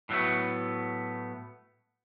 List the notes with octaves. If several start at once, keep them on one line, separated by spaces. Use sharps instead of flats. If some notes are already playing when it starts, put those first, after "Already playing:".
A2 F#3 A3 B3